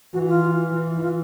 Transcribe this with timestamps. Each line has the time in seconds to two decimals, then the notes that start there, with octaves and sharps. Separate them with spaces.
0.13 E3 F#4
0.28 F4
0.74 E3
0.96 E4
1.03 F4